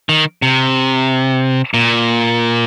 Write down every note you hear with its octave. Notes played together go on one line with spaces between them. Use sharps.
D#3
C3
A#2